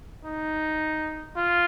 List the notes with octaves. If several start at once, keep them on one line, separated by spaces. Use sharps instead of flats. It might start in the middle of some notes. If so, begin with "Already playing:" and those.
D#4
F4